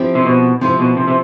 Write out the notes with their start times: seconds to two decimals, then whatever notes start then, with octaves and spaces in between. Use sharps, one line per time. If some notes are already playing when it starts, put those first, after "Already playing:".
Already playing: F3 C4 E4 G4
0.15 C3
0.26 B2
0.61 C3 F3 C4 E4 G4
0.79 B2
0.97 C3
1.08 C3